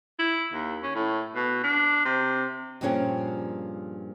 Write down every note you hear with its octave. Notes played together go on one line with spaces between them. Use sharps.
E4
D#2
C#4
A2
B2
D4
C3
G2 A#2 F3 C#4 G#4 G5